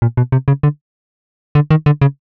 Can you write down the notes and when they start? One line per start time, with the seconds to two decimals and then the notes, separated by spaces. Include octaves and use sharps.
0.02 A#2
0.17 B2
0.32 C3
0.48 C#3
0.63 D3
1.55 D3
1.71 D#3
1.86 D3
2.01 C#3